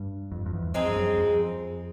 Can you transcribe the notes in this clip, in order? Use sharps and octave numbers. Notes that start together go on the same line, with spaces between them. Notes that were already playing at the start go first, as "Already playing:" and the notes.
Already playing: G2
F2
F2
E2
F2 G#3 C4 D#4 G#4
G2
F#2
F2